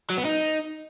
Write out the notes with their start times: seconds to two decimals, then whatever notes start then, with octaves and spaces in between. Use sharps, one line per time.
0.10 F#3
0.17 B3
0.25 D#4